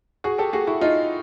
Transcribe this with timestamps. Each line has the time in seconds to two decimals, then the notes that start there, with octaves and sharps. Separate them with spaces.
0.24 F#4 G#4
0.38 G4 A4
0.53 F#4 G#4
0.67 E4 F#4
0.81 D#4 F4